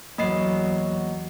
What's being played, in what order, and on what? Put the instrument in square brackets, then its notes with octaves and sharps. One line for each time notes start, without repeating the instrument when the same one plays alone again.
[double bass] E2 F#3 [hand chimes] A#3 D#5 C7